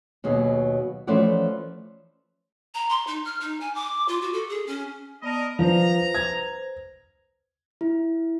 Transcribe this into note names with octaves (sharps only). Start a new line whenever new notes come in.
D#2 B2 F#3 G#4
E3 F3 A3 C#4 D5 F#5
A#5
C6
D#4
F6
D#4
G#5
D6
F4
F#4
A4
G#4
C#4
B3 A#4 D5 D#5 A5
F3 B4 C5 A#5
G#6
E4